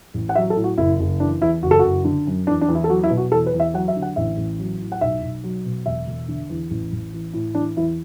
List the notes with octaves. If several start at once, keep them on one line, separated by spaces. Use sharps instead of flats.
A1
F#5
F#3 E5
A4
A2
F#4
F#1 E4
F#1
E3 D4
E2 E4
F#1 F#4
A4
F#1 F#4
D3
F#2
E2 D4
D4
E2
E4
A4
F#3 F#4
E4
B2
F#4
E2 A4
B4
E2
E5
F#3 F#5
E5
D3
F#5
A1 E5
A1
F#3
A2
F#5
B1 E5
B1
F#3
B2
E1 E5
E1
D3
E2
A1
A1
E3
A2
E3 D4
E2 E4